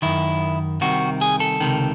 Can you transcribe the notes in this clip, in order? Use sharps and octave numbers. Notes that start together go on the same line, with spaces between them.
F#2 D#3 E4
C2 C3 D#3 F#4
G#4
A4
C#2 C3 D#3